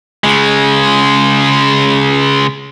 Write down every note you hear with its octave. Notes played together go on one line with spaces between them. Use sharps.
C#3 G#3